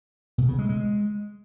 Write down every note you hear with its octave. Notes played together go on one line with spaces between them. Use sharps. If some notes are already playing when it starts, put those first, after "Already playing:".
B2
C#3
G#3
G#3